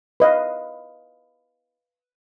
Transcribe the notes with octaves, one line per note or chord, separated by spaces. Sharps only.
B4 D#5 F5